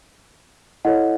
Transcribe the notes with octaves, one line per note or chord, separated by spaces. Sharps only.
E4 A4 C#5 D#5 F#5